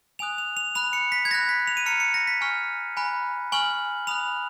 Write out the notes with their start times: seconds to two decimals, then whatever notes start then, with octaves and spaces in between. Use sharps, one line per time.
0.19 G#5 D#6 F#6 F7
0.38 F7
0.57 F7
0.75 B5 F#6 F7
0.93 C#7
1.12 B6
1.25 G#6
1.31 B5 A#6
1.34 F#6
1.49 B6
1.67 F7
1.77 D#7
1.86 A#5 F6 C#7
2.00 C#7
2.14 A#6
2.27 B6
2.41 G#5 C#6 F6
2.97 G#5 B5 F#6
3.52 G#5 C#6 F6 F#7
4.07 B5 D#6 F#6 F7